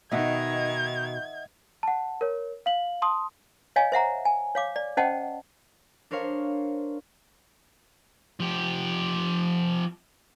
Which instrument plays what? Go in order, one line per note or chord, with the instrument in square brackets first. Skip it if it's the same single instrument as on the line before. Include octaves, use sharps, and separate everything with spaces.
[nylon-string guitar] B2 D#4 [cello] D#3 [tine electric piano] D#5 E5 F#5 [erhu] G#6
[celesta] F#5 A5
A#4 C#5
F5 F#7
A5 C6 D#6
[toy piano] C#5 D#5 F5 G#5
C5 E5 F#5 A#5
G#5
C#5 F5 D6
D5
C#4 C5 D#5 F#5 G5 A5
[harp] D4 A#4 C5 C#5 F5
[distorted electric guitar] F3 G4